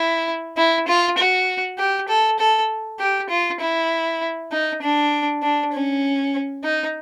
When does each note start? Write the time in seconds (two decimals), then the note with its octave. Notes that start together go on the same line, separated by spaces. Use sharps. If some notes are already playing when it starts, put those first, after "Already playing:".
Already playing: E4
0.57 E4
0.87 F4
1.18 F#4
1.78 G4
2.08 A4
2.39 A4
2.99 G4
3.30 F4
3.60 E4
4.52 D#4
4.82 D4
5.42 D4
5.73 C#4
6.64 D#4